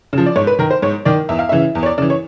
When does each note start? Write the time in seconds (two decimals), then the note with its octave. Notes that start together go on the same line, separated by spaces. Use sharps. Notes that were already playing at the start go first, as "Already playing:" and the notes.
0.13 C#3 F3
0.26 D5
0.36 G#2 C#5
0.47 B4
0.59 D#3 A#4
0.71 C5
0.82 G#2 C#5
1.05 D#3 D5
1.29 E2 E5
1.39 F5
1.49 C#3 E3 E5
1.75 E2
1.83 C#5
1.86 D5
1.98 C#3 E3 D5
2.10 C#5